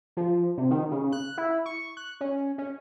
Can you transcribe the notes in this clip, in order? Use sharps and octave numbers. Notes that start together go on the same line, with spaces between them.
F3
C3
D#3
C#3
F#6
E4
C#6
F#6
C#4
C#4